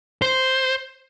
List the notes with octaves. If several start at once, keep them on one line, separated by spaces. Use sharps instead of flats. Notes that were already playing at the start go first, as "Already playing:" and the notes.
C5